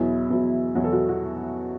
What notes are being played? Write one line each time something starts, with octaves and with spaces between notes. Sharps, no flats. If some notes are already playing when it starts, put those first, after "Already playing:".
Already playing: E2 B2 F#3 E4
E2 B2 F#3
E2 B2 F#3 F#4
A4
F#4
F#4